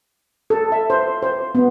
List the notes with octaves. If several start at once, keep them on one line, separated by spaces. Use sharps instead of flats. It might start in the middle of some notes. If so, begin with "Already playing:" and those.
A4
E5
C5
C5
B3